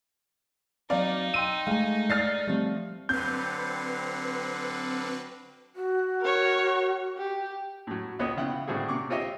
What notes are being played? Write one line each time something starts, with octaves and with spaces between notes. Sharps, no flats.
F#3 C4 D#4 D5 F5
G5 C6 E6 D#7
G#3 A3 F5 G#5
D5 F6 A6 C7
F3 G3 A3 C4
D3 F#3 C4 B4 F5 G6
F#4
A#4 C#5
G4
A2 F#3
C#2 B3 C#5 D#5 D#6
C#3 E4 F#5 G5
A2 D3 G3 C4 F#4 G#4
C3 C#6 D6
C4 F4 G4 C#5 D#5 E5